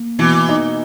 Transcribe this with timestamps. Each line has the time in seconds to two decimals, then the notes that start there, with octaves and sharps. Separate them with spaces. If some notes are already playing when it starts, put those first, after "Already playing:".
Already playing: A#3
0.19 B2 E3
0.49 D#4